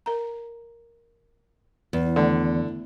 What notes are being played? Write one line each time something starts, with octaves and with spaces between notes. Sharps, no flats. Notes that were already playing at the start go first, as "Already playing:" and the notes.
A#4 A#5
E2
D3 D#3 A3 D5